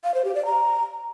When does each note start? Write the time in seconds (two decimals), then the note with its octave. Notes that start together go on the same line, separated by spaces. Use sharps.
0.04 F5
0.14 C5
0.25 G4
0.35 D5
0.45 A#5